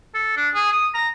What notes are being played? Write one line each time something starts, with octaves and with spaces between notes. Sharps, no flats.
A4
D4
G#4
D#6
A#5